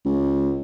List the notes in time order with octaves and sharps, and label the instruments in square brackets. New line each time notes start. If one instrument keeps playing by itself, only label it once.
[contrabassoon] C#2